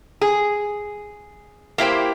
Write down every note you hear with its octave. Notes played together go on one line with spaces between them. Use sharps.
G#4
A#3 E4 G4 C5